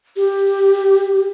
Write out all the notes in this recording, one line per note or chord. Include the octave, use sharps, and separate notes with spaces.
G4